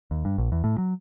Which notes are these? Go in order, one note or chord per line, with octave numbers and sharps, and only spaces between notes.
D#2
G2
A#1
E2
A2
F#3